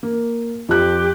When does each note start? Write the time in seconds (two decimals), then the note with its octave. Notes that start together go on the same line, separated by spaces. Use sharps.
0.03 A#3
0.69 F2 F3 G4 F#6